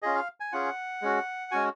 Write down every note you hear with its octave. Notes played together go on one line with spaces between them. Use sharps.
C#4 F4 G#4 D#5
F5
G#5
C#4 F4 G#4 F#5
G#3 C#4 F#4
G#3 C#4 F#4 G#5